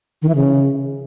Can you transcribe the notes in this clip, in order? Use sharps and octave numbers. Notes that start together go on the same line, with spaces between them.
D#3
E3
C#3